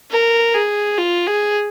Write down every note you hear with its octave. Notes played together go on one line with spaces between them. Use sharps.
A#4
G#4
F4
G#4